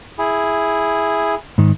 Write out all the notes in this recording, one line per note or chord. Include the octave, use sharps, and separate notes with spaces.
E4 G#4
G#2 D#3